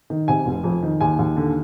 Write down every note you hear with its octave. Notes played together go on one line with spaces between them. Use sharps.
D#3
C3 G#5
F1
F2
D#3
D#2 G#5
D#2
D3